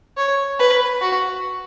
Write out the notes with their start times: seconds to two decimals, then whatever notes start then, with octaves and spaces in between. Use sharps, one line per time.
0.17 C#5
0.59 B4
1.02 F#4